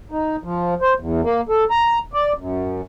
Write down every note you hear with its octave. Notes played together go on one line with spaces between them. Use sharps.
D#4
F3
C5
E2
A#3
A4
A#5
D5
F#2